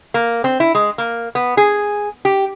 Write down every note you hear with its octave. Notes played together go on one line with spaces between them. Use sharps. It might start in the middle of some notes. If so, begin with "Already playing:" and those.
A#3
C4
E4
G#3
A#3
B3
G#4
G4